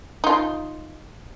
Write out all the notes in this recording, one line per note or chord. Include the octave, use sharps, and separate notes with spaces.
D#4 F4